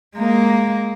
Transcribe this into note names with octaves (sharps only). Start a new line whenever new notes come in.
G#3 A#3